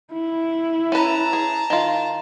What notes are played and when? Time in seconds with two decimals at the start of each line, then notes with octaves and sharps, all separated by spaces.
0.13 E4
0.92 C#4 B4 A5 A#5
1.33 G#4
1.70 D#3 F4